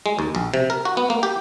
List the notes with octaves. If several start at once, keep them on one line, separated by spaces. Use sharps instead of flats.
G#3
D#2
A#1
C3
A#4
F#4
B3
A#3
G4